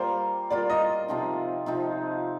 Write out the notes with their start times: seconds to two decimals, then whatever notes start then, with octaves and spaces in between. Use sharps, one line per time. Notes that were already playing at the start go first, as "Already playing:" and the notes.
Already playing: G3 A#3 F4 A#4 C5
0.50 G3 A#3 F4 A#4 D5
0.70 D#5
1.08 C3 F3 C4 D#4
1.66 C3 F3 C4 D#4